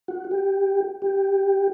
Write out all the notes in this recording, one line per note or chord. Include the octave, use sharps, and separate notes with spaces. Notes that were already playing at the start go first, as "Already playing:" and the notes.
F#4
G4
G4